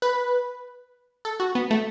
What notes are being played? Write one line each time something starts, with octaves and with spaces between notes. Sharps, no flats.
B4
A4
F#4
B3
A3